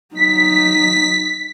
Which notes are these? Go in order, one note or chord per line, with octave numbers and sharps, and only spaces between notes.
F#3 D#4 B6